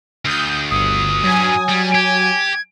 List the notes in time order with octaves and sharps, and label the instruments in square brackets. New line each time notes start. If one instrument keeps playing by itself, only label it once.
[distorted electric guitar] D2 [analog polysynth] D#6 G6
[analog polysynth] G1 [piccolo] D#6
[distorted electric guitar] G2 [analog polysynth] F#3 G#5
[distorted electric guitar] G3
[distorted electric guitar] G4 [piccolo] G#6